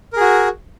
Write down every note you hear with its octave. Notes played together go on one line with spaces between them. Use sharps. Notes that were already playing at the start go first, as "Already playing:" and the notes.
F#4 G#4 A#4